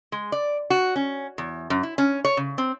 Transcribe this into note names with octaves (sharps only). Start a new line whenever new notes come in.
G#3
D5
F#4
C#4
E2
F#2
E4
C#4
C#5
C#3
C4